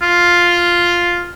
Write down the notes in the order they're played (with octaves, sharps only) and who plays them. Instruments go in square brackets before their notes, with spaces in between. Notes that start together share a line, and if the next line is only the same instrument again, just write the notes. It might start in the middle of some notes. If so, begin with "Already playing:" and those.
[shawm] F4